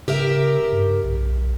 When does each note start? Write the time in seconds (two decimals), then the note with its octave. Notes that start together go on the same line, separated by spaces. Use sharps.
0.08 C#3 G4 A#4 E5
0.73 G2
1.04 B1